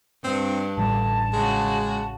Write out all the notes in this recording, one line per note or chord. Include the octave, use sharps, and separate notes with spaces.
G2 C4 D4
A1 D3 G3 A5
C#3 G#3 F#4